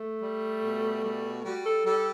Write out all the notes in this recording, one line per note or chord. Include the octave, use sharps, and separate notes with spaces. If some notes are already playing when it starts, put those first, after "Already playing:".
Already playing: A3
G3
B2
G3
G3 F#4
A4
G3 A4